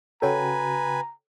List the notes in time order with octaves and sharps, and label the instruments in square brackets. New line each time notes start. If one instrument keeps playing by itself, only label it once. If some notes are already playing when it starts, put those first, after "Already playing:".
[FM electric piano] C#3 F#4 G5 [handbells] A4 C#5 [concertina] B4 G#5 [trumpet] A#5